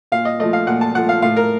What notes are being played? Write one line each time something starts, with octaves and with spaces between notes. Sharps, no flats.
A#2 F5
D#5
F3 A3 D#5
F5
A#2 F#5
A5
F3 A3 F#5
F5
A2 F5
A#4